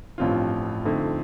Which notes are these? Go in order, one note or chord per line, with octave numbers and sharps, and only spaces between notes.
A1 G2 F3 C4 F4
F2 D3 A3 C4 D#4